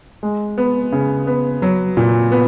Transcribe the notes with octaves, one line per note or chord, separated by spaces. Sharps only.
G#3
B3
C#3
B3
F#3
A#2
B3